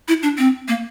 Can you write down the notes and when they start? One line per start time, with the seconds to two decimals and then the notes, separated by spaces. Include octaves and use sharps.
0.08 E4
0.23 D4
0.38 C4
0.68 A#3